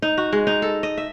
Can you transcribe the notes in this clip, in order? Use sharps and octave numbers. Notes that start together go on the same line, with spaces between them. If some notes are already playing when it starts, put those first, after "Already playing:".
D#4
F#4
G#3
D#4
A4
D#5
E5